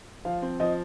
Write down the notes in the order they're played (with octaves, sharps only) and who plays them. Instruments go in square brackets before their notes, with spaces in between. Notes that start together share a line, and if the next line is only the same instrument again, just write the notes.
[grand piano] F3 [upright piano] F5
[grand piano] C4
[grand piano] F3 [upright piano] D#5